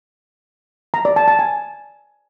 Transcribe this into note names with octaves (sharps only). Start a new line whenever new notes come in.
A#5
D5
A5
A5
G#5